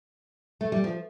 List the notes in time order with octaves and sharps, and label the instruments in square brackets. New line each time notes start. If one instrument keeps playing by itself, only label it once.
[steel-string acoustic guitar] A3
G3
F3